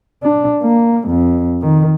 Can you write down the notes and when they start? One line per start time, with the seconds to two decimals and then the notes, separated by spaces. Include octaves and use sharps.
0.23 D4
0.63 A#3
1.08 F2
1.62 D#3